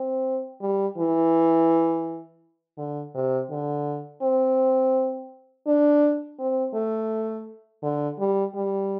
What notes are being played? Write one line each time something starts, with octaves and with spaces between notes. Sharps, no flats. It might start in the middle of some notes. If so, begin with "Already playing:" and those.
Already playing: C4
G3
E3
D3
C3
D3
C4
D4
C4
A3
D3
G3
G3